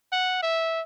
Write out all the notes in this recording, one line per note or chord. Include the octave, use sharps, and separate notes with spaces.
F#5
E5